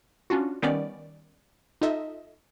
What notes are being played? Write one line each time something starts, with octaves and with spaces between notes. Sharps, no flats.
C#4 D4 F4 F#4
D#3 G3 B3 C#4 D5
D#4 F4 A4 D#5 E5